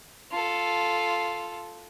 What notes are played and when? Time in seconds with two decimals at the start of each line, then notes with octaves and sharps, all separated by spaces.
0.32 F4 A4